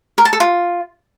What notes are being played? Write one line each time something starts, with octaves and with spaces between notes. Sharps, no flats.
A#4
A5
A4
F4